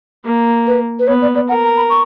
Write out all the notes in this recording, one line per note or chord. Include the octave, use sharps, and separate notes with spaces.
A#3
B4
B4
B3 C#5
D5
D5
A#4 F#5
A#5
B5
C#6